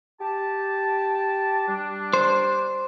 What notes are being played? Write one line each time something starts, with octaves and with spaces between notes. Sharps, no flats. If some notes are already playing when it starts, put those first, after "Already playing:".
G4 A5
G3 D4
C5